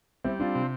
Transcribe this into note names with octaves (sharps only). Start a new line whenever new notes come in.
G3 C4 E4
C4 D4 F4
C3